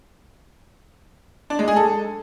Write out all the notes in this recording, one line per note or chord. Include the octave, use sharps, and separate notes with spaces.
D4
G#3
G#4
A4